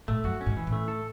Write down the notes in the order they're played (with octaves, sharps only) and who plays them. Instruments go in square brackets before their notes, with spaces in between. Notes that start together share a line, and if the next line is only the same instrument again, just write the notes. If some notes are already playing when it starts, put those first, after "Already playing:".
[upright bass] A2 [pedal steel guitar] A3
[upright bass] F#2 [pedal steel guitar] F#4
[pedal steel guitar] C#4
[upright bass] G#2
[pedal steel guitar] E3
[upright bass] A2
[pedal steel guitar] A3
A4